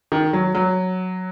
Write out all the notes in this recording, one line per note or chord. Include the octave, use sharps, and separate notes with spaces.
D#3
F#3
F#3